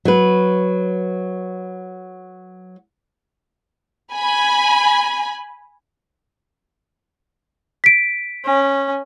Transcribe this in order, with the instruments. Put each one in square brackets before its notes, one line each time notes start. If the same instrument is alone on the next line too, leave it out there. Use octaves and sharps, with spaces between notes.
[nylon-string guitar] F#3 B4
[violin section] G#5 B5
[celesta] B6 D7
[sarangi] C#4